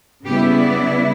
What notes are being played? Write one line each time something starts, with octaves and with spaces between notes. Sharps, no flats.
C#3 G3 B3 E4 G4
D5